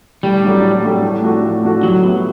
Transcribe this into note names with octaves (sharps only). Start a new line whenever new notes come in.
A2 G3
F#3 A3 D4 G4
A2
F#3 A3 D4 G4
A2
F3 A3 D4 F#4
A2
F3 A3 D4 F#4
F#3 G3
B3 E4